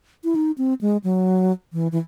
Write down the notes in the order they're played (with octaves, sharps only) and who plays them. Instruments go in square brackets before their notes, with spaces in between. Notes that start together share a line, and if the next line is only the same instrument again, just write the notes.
[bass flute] E4
D#4
C4
G#3
F#3
E3
E3